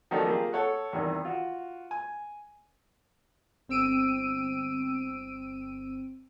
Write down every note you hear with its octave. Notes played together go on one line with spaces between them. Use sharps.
D#3 F3 F#3 A3 D4 D#4
A#3 F4 G4 G#4
A4 C#5 F#5
E2 C3 D#3 E3 G3
F4 F#4
G#5
G1 C4 E6 D7 D#7